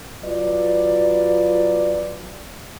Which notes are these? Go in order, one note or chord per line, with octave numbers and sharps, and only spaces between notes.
F#3 F4 B4 D5